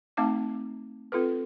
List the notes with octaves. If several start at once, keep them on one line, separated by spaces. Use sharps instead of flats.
A3 C4 D#4 F5 A5 D6
C4 F4 A4 B4